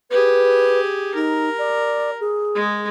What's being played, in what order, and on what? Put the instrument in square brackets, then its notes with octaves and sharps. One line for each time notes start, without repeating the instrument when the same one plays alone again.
[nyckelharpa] G4 G#4 [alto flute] B4
[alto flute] D#4 [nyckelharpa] A#4
[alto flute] D5
G#4
[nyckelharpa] G#3